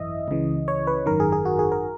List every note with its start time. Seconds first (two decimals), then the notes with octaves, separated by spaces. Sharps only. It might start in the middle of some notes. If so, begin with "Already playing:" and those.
Already playing: G#1 F#2 E3 D#5 E5
0.28 C#2 C#3 E3
0.68 C#5
0.87 B4
1.06 G#1 F#2 D#3 A#4
1.20 G#4
1.32 G#4
1.45 F#4
1.59 G#4
1.72 A#4